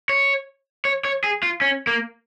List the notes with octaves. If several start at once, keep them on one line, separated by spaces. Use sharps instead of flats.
C#5
C#5
C#5
G#4
F4
C#4
A#3